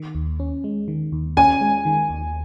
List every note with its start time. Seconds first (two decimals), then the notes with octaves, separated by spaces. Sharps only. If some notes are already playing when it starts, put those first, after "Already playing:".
Already playing: D#3
0.15 D#2
0.40 C#4
0.64 G#3
0.88 D#3
1.12 D#2
1.37 C#4 G#5
1.61 G#3
1.85 D#3
2.10 D#2